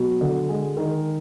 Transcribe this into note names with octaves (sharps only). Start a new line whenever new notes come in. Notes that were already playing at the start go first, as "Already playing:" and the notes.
Already playing: B2 F#3
D3
G#3
D#3